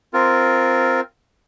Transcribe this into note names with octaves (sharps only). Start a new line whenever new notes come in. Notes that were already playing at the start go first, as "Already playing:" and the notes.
C4 F4 A#4